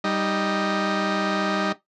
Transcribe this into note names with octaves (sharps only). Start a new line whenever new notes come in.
G3 D#4